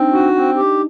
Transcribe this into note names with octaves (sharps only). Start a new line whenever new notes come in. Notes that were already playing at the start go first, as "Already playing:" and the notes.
Already playing: C4 D4 D#4
F#4
C4
G4